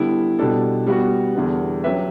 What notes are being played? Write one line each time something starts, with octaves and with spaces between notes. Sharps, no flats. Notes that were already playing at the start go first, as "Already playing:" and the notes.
Already playing: D3 G3 B3 E4
B2 G3 D4 A4
G3 B3 F#4
E2 D3 G3 B3
F#3 C#4 G4 B4 E5